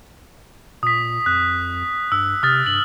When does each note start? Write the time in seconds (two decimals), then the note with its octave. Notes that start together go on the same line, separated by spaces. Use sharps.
0.83 A#2 D#6 B6
1.26 F2 F#6
2.12 G2 E6
2.43 C3 D#6 F6 A6
2.66 G2 F#7